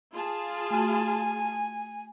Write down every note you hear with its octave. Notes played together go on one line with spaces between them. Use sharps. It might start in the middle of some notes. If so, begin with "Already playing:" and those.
F4 G#4 A5
A3 F#4 G#5